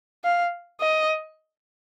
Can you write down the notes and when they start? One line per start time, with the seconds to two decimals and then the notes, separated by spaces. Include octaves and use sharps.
0.24 F5
0.81 D#5